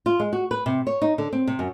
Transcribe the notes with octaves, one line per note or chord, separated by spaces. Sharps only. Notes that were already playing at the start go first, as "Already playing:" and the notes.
F4
G#3
F#4
B4
C3
C#5
D#4
D3
C4
C3
F#2